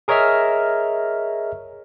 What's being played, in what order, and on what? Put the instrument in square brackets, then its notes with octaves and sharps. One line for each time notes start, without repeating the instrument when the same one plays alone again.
[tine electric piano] G#4 A#4 C#5 D#5 E5 F6